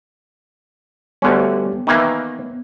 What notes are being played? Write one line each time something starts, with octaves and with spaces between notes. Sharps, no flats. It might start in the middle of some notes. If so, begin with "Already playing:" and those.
D2 D3 G3 B3 C#4 G4
D#3 E3 A#3 B3